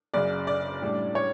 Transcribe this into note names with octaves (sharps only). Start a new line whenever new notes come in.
F#1 F#2 C#3 D5
D5
A2 G3 D4
C#5